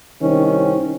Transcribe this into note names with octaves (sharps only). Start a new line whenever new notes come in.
C2 D#3 C4 C#4